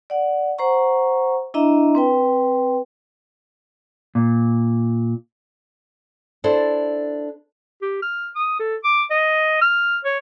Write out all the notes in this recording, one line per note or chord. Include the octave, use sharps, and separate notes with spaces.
D5 F#5
C5 F#5 A#5 C#6
D4 E4 D#5 E5 A#5
C4 B4 G5
A#2
D4 E4 A4 C5
G4
F6
D#6
A4
D6
D#5
F6
C#5